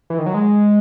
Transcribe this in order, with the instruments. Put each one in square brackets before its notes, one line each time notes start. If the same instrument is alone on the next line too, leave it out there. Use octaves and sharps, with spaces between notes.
[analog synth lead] E3
D#3
F#3
G#3